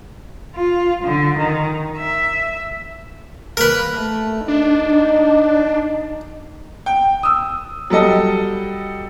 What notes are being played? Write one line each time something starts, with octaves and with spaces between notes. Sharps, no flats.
F4
D3
D#3
E5
A#3 A#4 B4
A3
D4 D#4
G5
D#6 E6
F#3 G3 A4 D#5